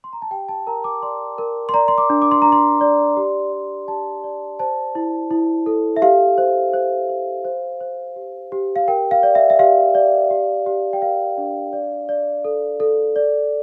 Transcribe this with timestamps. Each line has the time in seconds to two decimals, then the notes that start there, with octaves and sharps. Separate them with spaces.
0.04 C6
0.13 A#5
0.22 A5
0.31 G4 G5
0.49 A5
0.67 A#4 A#5
0.84 D6
1.02 D5 C6
1.38 A#4
1.69 C6
1.74 D5 A#5
1.88 C6
1.98 D6
2.10 D4
2.22 D6
2.31 C6
2.42 D4 A#5
2.52 C6
2.81 D5
3.17 G4
3.52 D5
3.88 G4 A5
4.24 D5
4.59 C5 A5
4.95 E4
5.31 E4
5.66 A4
5.96 E5
6.02 G4 F5
6.38 C5
6.74 C5
7.09 C5
7.45 C5
7.80 C5
8.16 G4
8.52 G4
8.76 F5
8.88 A#4 G5
9.11 F5
9.23 D5
9.35 E5
9.50 E5
9.59 G4 F5
9.95 D5
10.30 G4
10.66 G4
10.93 G5
11.02 A#4 F5
11.38 D4
11.73 D5
12.09 D5
12.45 A4
12.80 A4
13.16 D5